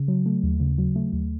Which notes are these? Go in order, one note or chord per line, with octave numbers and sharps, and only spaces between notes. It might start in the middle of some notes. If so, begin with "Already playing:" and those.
Already playing: C#3
F#3
A3
D#2
C#3
F#3
A3
D#2